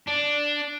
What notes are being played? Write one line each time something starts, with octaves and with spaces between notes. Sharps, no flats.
D4